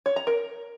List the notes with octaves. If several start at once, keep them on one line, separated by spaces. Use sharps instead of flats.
C#5
A#5
A#4